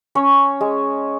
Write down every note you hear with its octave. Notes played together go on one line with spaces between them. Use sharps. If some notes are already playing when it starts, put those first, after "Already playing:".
C#4 C#5
G#3